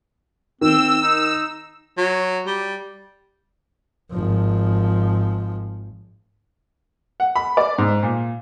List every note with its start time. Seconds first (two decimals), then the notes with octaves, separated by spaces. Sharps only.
0.61 D#3 C4 E6
1.02 D#4
1.97 F#3
2.46 G3
4.11 G#1 F3
7.20 F#5
7.36 B5
7.57 D5
7.78 G#2
8.03 A#2